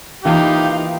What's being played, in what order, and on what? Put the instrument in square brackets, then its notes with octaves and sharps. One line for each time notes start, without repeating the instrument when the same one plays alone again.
[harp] E3 A#3 F4 [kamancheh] D#4 F5 [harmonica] G4